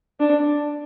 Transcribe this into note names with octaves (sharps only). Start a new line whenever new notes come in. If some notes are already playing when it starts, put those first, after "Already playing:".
D4